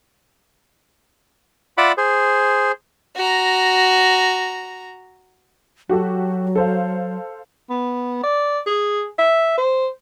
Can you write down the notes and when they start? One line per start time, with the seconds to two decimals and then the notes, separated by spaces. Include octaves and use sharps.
1.78 F4 D5 E5 F#5 B5 D6
1.98 G#4 C5
3.16 F#4 A#5
5.89 F#3 F#4 G4 A4
6.56 A4 C5 F5
7.70 B3
8.23 D5
8.67 G#4
9.19 E5
9.57 C5